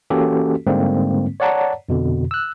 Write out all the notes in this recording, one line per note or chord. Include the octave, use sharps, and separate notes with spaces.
E3 A#3 C#4 F#4 G4 A4
G#2 D3 G3 G#3 A#3 C4
C#5 D5 F#5 A5 A#5
F2 B2 D3
E6 F#6